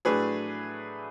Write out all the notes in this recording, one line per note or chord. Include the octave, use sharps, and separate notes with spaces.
A2 F#3 A3 D4 G#4 B4